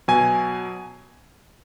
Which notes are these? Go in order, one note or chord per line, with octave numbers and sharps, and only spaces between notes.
B2 F#3 G#5